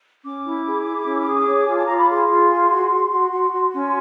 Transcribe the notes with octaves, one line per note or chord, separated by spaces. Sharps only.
C#4 D6
E4
G#4
E4
C#4
G#4
C#5
F4 G#5
A5
F4 A#5
B5
G#4 C6
F4
G#4
F#4
F#4
F#4
F#4
F#4
C#4